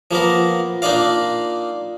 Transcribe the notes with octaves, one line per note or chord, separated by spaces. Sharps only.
F3 A#3 B3 A#4
A#3 D4 D#4 F4 D5 F5